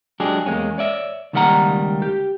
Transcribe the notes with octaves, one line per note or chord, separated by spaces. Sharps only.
F#3 G#3 D4 G4 G#4
E2 G#3 A#3 C#4
C#5 D5 E5
C#2 D#3 G3 A#3 F#5 A#5
G4